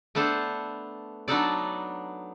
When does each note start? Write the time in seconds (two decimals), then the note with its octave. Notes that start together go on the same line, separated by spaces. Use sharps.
0.15 A3 B3 D4 A4 C5
1.28 F#3 B3 D4 D#4 A4 D5